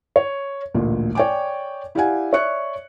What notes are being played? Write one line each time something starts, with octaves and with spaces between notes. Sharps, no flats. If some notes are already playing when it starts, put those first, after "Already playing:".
C#5
A1 D2 A#2
C#5 D5 G5 G#5 D6
E4 G4 D5 F5 F#5 G#5
C#5 D5 E5 C#6 F#6 C#7